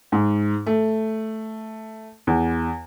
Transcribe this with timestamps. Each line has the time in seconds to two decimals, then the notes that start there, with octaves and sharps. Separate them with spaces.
0.12 G#2
0.66 A3
2.27 E2